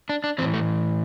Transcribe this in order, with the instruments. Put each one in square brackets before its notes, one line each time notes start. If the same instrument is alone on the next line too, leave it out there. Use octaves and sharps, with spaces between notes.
[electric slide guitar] D4
D4
A2 E3 C4
A3